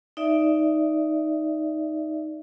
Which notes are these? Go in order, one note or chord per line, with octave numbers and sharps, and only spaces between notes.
D#4 D5 E5